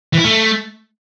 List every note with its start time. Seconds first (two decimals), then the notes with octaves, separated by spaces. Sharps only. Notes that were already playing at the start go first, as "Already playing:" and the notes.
0.13 E3
0.19 E4
0.24 A3